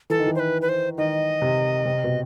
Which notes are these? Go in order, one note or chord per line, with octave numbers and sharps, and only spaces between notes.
E3 A4
D#3
E3
C5
B4
B4
C5
D#3 D#5
C3
C3
B2